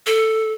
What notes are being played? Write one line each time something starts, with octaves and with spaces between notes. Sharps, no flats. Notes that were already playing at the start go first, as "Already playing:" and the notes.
A4